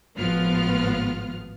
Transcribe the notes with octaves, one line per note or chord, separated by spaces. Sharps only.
G#1 A2 F3 B3 F4 F6